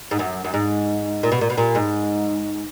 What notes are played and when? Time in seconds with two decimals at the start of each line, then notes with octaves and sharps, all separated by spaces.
0.11 G#2
0.19 F#2
0.44 F#2
0.54 G#2
1.23 A#2
1.32 B2
1.41 A#2
1.50 B2
1.57 A#2
1.75 G#2